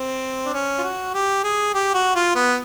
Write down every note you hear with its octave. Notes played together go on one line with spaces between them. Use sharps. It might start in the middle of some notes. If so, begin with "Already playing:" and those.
Already playing: C4
D4
C#4
F4
F#4
G4
G#4
G4
F#4
F4
B3